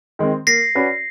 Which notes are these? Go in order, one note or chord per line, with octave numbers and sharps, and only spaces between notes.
D#3 G#3 C4
A#3 A#6 C7
C#4 F#4 B4 D5